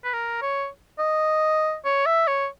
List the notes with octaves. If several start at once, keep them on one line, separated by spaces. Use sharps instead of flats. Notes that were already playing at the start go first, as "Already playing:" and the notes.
B4
A#4
C#5
D#5
C#5
E5
C#5